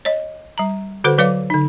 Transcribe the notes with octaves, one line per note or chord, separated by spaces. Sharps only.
C#5 D#5
G3 A#5
D3 F#4 A4 B4 C5 F#5
F#3 B4 D5 F5 D6
D3 D#4